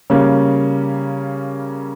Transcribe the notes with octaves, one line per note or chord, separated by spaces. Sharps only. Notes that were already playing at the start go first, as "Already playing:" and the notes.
C#3 G3 A#3 C#4